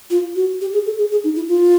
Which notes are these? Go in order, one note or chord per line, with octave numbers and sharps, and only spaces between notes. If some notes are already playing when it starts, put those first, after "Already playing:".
F4
F#4
G4
G#4
A4
G#4
G#4
D#4
E4
F4